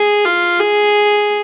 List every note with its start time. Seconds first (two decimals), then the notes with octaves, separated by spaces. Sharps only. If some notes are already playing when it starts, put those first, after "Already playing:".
Already playing: G#4
0.25 F4
0.60 G#4